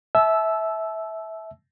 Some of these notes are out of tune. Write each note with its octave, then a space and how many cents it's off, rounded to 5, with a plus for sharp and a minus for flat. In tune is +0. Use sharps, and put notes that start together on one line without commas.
E5 -15 A5 -35 E6 +0